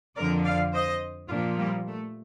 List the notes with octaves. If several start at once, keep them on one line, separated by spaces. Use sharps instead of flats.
F2 D3 F3 A#4 D5
D5 F5
C5 D#5
A#2 F3 D4 F4
G3 A#3
A3